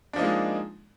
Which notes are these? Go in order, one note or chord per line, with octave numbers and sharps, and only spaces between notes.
F3 G#3 A#3 D4 D#4